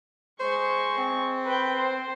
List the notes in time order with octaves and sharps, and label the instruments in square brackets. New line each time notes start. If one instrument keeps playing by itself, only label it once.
[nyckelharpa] G#3 C#6 [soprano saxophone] C5
[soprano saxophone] C4
[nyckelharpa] B4 G5
C5